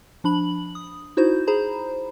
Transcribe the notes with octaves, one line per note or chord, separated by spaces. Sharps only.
F3 D4 B5 F#7
D#6
D#4 E4 F#4 C5 G6
G#4 C5 A#5 B5